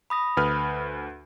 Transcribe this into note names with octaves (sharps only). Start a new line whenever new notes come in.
B5 D#6 A#6
D2 B4 F6